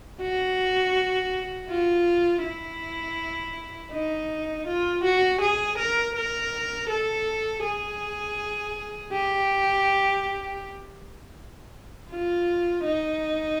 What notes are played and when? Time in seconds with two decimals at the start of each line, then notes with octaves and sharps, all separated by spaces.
0.21 F#4
1.70 F4
2.44 E4
3.92 D#4
4.67 F4
5.04 F#4
5.41 G#4
5.78 A#4
6.16 A#4
6.89 A4
7.63 G#4
9.12 G4
12.10 F4
12.85 D#4